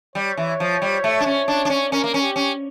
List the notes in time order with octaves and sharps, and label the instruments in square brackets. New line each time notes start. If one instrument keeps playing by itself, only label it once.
[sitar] G3 [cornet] C#5
[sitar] E3
F3
G3
A3
D4
C#4
D4
D4
C#4
[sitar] C#4 [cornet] A#4
[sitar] A#3
C#4
[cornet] G4
[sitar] C#4